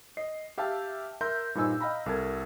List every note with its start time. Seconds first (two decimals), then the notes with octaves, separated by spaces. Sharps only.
0.17 D#5 C7
0.58 G4 E5 F5 G5 A5
1.21 A#4 E5 A#5 C6 G6
1.55 G2 A#2 D#4 C5 G#5 E6
1.81 D#5 F5 G5 A#5 B5
2.06 C2 A4 A#4 A5 G#6